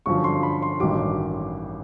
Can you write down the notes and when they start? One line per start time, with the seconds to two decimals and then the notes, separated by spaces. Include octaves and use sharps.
0.06 G1 F#2 D3 F3 C#6
0.24 C6
0.43 B5
0.62 C6
0.80 A1 G2 D#3 F#3 D6